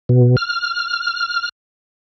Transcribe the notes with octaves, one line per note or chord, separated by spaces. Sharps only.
B2
F6